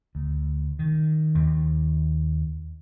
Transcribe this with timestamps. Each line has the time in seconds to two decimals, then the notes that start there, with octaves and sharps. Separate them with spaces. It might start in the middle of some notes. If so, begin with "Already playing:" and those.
0.15 D2
0.79 D#3
1.35 D#2